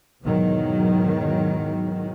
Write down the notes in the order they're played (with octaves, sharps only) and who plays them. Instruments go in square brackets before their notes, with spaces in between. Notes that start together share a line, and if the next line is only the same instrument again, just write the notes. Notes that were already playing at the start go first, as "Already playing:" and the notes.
[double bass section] E2 G#2 B2 D#3 F#3